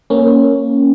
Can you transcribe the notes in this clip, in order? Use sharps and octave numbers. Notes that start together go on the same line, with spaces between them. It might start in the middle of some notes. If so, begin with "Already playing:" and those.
A#3 C#4